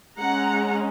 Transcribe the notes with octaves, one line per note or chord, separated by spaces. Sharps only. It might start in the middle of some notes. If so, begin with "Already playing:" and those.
G#3 C#4 F#5 A#5